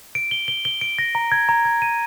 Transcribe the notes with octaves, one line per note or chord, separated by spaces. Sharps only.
D7
G7
G7
G7
D7
A#6
A#5
G#6
A#5
G#6
D#7